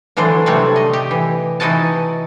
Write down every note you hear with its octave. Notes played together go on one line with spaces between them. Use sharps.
D3 E3 F#3 D4 C5
C3 G3 A3 C4 F#4 C#5
D#5
G4
E3
E3 D#4 E4 F#4 D#5 A5